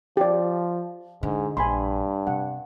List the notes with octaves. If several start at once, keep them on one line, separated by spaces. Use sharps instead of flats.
F3 G4 D5
G#2 D3
A#1 G2 G#5 B5 C6
C3 F#5